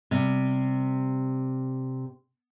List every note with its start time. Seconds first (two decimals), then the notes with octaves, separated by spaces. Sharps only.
0.11 C3 G3